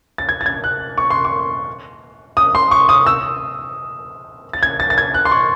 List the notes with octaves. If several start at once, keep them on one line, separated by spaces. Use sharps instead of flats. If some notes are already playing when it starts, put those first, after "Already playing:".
A6
G#6
A6
G#6
F#6
C#6
C6
C#6
D#6
C6
C#6
D#6
E6
A6
G#6
A6
A6
G#6
F#6
C6
C#6